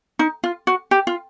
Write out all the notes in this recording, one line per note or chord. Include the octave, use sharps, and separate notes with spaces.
D#4
F4
F#4
G4
F4